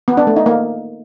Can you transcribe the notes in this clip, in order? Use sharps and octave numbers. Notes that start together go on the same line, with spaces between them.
B3
D4
A3
D#4
A#3